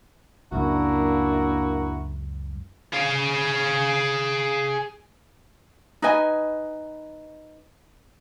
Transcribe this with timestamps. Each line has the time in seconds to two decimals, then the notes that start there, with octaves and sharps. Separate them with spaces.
0.52 C#2 F#2 A#3 D4 E4 F#4 A#4
2.93 G#4 F5
6.02 D#4 B4 D#5 G#5